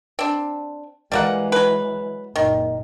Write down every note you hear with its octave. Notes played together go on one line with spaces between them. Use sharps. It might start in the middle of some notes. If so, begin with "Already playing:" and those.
C4 D4
E3 G3 G#3 A#3 F#5
F#3 B4
F#1 A#2 D#3